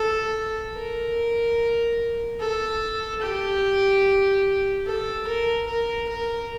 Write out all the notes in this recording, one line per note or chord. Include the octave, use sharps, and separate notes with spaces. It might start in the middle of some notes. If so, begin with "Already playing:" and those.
Already playing: A4
A#4
A4
G4
A4
A#4
A#4
A#4